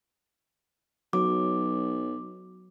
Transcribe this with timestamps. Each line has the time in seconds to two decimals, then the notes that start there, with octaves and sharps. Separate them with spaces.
1.13 B1 F#3 D6